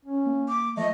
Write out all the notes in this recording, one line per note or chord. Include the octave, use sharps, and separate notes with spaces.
C#4
A#3
D6
F3 A3 D#5